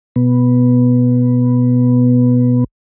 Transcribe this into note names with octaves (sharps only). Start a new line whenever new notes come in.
B2 B3